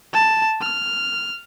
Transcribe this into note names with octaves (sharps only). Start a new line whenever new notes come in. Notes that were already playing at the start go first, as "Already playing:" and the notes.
A5
F6